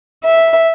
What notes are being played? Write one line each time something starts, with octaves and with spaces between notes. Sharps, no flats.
E5